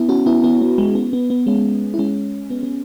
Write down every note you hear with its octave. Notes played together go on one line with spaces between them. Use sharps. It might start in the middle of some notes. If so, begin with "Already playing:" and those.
Already playing: B3 E4
C#4 F#4
B3 E4
B3 E4
B3
G#3
B3
B3
B3
G#3 C#4
E4
G#3 C#4
B3
B3